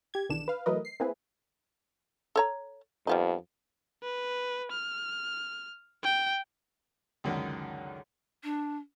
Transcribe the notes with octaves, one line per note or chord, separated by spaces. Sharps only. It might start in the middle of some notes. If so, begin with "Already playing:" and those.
G4 G#6
B1 E2 D3 D#3 D4 E7
B4 F5
E3 F#3 A3 A#4 B4 D#5
C7
A#3 C4 E4 G#4 B4
A4 C#5 A#5
F2 G3 B3 D#4
B4
F6
G5
C#2 F#2 D3 D#3
D4